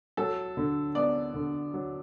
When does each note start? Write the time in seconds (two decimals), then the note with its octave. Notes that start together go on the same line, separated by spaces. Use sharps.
0.17 F#3 A4
0.57 D3
0.95 B3 D5
1.34 D3
1.74 F#3